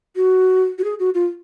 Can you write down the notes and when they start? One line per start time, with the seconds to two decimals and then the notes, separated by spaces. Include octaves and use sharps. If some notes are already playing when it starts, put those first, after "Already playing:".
0.16 F#4
0.78 F#4
0.84 G#4
0.99 F#4
1.14 F4